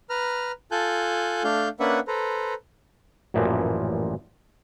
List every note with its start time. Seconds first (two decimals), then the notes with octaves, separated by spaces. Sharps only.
0.10 B4 A#5 F6
0.71 F4 A4 G#5 A5 F#6 G6
1.44 A3 D4 F5 G6
1.80 A#3 C#4 D4 B4 E5 F#5
2.07 A4 B4 C5 A#5
3.34 A1 F#2 A#2 E3 F3 A#3